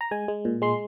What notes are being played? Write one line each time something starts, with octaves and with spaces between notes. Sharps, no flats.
A#5
G#3 G#5
G#3
A#2
G#3 C6